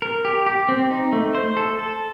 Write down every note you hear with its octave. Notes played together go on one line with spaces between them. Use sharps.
A#4
G4
G4
C4
D#4
A3
C5
A4
A4